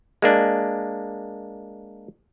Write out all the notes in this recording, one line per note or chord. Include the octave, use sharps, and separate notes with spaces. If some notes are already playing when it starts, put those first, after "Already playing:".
G#3 A#3 D4